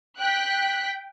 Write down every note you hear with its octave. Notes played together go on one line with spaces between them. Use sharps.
G5 F#6 B6